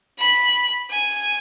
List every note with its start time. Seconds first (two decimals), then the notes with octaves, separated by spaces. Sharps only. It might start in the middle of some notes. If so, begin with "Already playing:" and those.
0.19 B5
0.91 G#5